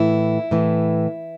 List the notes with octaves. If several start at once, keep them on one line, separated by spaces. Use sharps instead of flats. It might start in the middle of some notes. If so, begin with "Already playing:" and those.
Already playing: A2 E3 E4
A2 E3